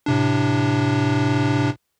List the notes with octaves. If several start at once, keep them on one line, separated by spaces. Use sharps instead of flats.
A2 C3 D4